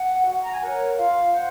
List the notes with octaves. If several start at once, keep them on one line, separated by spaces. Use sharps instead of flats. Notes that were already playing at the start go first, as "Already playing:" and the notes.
Already playing: F#5
F#4
A#5
G#5
A#4 C#5 F#5
F4 F5
C5 F#5